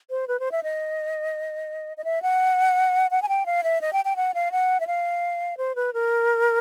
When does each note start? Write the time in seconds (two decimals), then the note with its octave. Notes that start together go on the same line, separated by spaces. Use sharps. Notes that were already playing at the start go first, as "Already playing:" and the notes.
0.10 C5
0.28 B4
0.40 C5
0.52 E5
0.63 D#5
1.97 D#5
2.04 E5
2.22 F#5
3.11 F#5
3.22 G#5
3.29 G5
3.46 F5
3.63 E5
3.81 D#5
3.93 G5
4.05 G5
4.16 F#5
4.34 F5
4.52 F#5
4.80 E5
4.87 F5
5.57 C5
5.75 B4
5.94 A#4